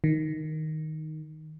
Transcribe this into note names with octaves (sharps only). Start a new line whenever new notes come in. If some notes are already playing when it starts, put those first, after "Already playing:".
D#3